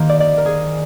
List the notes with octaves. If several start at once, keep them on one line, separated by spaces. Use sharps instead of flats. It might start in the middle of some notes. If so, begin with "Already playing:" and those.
Already playing: D#3 A#3 G4 C5
D5
D5
A#4
G#4